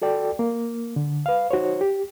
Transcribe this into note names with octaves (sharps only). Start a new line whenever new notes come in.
F#4 A4 D5 G5
A#3
D3
B4 F5
D#4 F#4 C5 C#5
G4